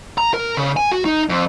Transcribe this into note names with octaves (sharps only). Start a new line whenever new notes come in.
A#5
A#4
C#3
G#5
F#4
D#4
F2